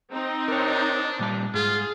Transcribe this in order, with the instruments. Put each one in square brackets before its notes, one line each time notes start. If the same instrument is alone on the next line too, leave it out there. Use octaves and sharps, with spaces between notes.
[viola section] C4 D#4
[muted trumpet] D4 [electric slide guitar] A#4 C#5
[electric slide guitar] A#2 G3 A5
[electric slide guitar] G#2 [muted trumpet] F4 [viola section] G#4